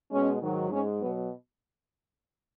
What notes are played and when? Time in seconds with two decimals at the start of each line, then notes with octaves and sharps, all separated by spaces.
0.12 B2 G#3 C#4
0.41 G#2 D#3 F#3
0.71 G#2 G#3 C#4
1.00 B2 F#3 B3